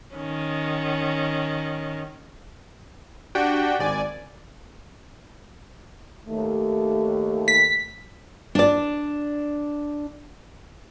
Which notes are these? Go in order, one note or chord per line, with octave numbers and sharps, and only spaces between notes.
D#3 C#4
D4 F#4 G4 G5
G#1 D5 G#5
D#2 A3
B6
D4 D5